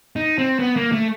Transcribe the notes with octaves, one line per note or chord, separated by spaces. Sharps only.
D#4
C4
B3
A#3
A3